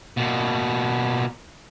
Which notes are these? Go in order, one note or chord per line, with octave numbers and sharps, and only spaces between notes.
B2 A#3